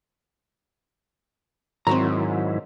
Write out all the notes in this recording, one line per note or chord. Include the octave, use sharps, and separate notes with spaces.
G#2 D#3 F#3 C4 E4 F#4 A#5